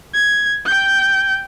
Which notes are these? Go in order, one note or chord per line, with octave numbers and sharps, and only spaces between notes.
G#6
G5 G6